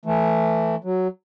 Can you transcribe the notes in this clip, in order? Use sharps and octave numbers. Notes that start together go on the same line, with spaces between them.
E3 A3
F#3